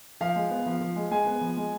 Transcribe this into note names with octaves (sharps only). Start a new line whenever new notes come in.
F3 F5
G#3
B3
F3
F3
G#3
G#3 G#5
B3
F3
G#3